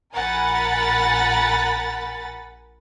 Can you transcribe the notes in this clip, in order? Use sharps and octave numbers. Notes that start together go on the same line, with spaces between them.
A#1 A#4 F#5 G#5 B5 A6